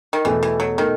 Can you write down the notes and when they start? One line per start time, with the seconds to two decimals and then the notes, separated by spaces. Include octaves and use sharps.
0.13 D#3
0.25 E2 B2 E3 A3
0.43 E3
0.60 F#3
0.78 B2 D#3 A3